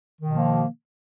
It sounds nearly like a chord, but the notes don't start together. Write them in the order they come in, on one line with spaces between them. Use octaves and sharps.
D#3 B2 F3 A#3